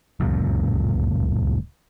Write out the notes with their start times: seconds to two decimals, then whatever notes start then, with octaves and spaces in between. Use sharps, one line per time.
0.20 D1 C#2 F#2 A#2